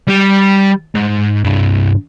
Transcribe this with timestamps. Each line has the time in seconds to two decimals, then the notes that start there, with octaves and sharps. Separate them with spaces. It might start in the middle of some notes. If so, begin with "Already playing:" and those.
0.08 G3
0.95 G#2
1.44 C2 G2